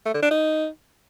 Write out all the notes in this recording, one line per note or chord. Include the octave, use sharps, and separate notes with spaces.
A3
D3
D4
D#4